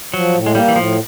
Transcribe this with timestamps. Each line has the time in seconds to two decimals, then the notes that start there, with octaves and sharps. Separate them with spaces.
0.14 F3 F#3
0.35 A2
0.46 G#3
0.54 G3 A#3
0.68 E3
0.75 A2 F3